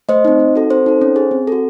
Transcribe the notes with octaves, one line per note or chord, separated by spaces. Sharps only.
A3 C5 D#5
C4 D#4
D#4
F#4 A4
C4 C5
D#4 A4
C#4
G#4
C4
F#4 A4